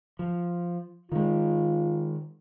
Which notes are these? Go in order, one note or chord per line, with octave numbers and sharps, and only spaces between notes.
F3
D#3 G#3 F4